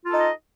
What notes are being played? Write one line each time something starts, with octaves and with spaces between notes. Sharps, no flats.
D#4 F4 A4 D#5